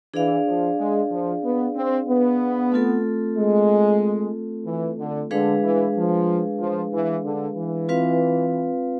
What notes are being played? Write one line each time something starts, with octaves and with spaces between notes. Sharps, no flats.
E3 D4 G#4 D5 F5
F3
G#3
F3
B3
C4
B3
A3 C4 F4 A4
G#3
E3
D3
D3 G#3 D4 G#4 B4 F5
E3
F3
F3
E3
D3
E3
C4 F4 B4 F5